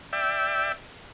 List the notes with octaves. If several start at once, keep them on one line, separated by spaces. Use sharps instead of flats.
D5 E5 G5